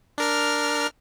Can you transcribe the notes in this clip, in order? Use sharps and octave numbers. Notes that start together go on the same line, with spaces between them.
D4 A#4 F6